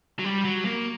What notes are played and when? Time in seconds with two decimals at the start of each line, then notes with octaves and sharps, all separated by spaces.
0.19 F#3
0.24 G3
0.45 F#3
0.65 A#3